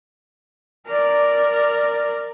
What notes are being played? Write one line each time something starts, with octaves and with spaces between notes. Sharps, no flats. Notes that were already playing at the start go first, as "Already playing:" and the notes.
A#4 D5